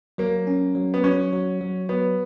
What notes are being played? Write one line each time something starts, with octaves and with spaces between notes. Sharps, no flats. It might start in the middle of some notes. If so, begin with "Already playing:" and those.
F#3 A#3
C#4
F#3
B3
F#3 C#4
F#3
F#3
F#3 B3